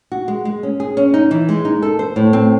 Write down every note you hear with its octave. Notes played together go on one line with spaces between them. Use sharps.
F#4
G#3
G#3
C#4
G#4
C#4
D#4
E3
G#3
D#4
A4
C5
A2
C4